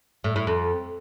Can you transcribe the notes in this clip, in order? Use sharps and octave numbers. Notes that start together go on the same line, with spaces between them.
A2
A2
F2